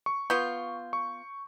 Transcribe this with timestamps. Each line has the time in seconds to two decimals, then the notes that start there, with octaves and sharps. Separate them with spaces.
0.06 C#6
0.30 B3 F4 C#6 G6
0.93 C#6